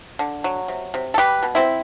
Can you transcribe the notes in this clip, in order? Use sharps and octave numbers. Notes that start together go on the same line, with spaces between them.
D3
F#3
C3
C3
A4
G3 G4 B4
B2
C4 E4